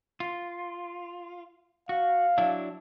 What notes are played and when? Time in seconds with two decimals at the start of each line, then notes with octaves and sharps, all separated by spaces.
0.20 F4
1.89 F#4 F5
2.38 F#3 D4 E4